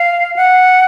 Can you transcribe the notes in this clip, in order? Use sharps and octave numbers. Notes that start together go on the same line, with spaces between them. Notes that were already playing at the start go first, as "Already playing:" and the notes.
Already playing: F5
F#5